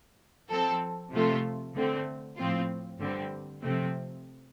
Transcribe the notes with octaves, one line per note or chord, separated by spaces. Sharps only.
F3 C4 A4
C3 F3 A3 F4 A4
D3 A3 C4
A2 F3 C4 F4
G2 D3 G3 C4
C3 F3 A3 C4